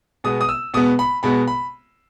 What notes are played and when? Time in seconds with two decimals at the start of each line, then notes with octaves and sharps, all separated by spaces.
0.24 B2 G#3 B3 D#6
0.41 D#6
0.49 E6
0.74 B2 G#3 B3 D#6
0.99 B5
1.23 B2 G#3 B3 B5
1.48 B5